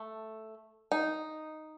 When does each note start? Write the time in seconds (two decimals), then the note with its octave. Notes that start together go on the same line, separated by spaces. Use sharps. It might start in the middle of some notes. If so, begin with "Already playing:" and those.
Already playing: A3
0.92 D#4